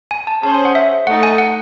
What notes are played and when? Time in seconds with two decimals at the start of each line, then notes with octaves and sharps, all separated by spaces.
0.11 G#5
0.27 A5
0.43 C#4 G#4 C5 A5
0.55 G#5
0.65 F#5
0.75 E5
1.07 A3 D#4 A4 F#5
1.23 G#5
1.38 F#5